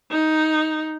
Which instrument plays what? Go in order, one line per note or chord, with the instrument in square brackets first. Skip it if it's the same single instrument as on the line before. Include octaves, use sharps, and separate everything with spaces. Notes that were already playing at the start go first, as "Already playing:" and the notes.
[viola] D#4